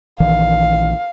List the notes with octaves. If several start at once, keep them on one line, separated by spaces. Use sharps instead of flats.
A#1 D#3 E3 F5